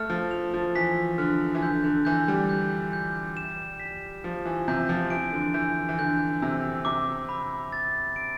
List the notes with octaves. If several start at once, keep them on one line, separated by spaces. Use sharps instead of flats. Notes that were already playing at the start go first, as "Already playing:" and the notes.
Already playing: A3 F6
F3
F7
F3
E3 B6
D3 F6
E3
D3 G6
D3
E3 G6
G3
G6
G6
E7
B6
F3 E7
E3
C3 G6
F3
E3 D7
D3
E3 G6
E3
D3 G6
C3 E6
C3 D6
B5
A6
D7